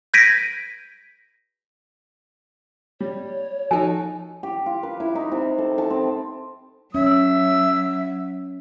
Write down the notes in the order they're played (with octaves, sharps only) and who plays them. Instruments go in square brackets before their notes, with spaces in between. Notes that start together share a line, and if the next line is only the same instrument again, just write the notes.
[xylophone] G6 G#6 A#6 B6 D7 D#7
[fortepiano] G3 [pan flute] C#5
[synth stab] F3 D#4 [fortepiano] F#4 A4 [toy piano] G#5
[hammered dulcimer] G4
F4
B4
E4
D#4
C3
A4
A5
C4
[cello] F#3 [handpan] C#4 [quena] E5 [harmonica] E6